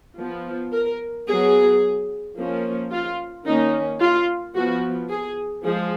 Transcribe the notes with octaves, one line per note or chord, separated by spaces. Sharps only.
F3 B3
A#4
F#3 B3 G#4
F3 A#3 C#4
F4
D#3 A#3 C#4 D#4
F4
F3 B3 F#4
G#4
F3 G#3 G#4